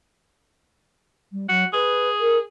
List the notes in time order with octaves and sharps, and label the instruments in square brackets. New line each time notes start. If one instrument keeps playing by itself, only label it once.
[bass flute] G3
[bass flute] F#3 [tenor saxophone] F#4
[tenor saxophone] G#4 [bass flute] B4
[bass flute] A#4